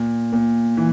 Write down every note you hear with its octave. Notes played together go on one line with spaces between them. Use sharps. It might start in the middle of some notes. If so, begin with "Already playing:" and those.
Already playing: A#2
A#2
E3